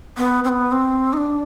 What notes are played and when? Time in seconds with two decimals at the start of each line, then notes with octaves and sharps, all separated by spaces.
0.17 B3
0.44 C4
0.49 B3
0.72 C4
1.13 D#4
1.17 D4